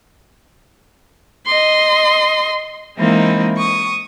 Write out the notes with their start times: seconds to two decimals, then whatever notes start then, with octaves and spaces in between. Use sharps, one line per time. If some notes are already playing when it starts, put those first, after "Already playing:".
1.46 D#5 C6
2.99 E3 G#3 A#3 C4 D#4 E4
3.58 C#6 D#6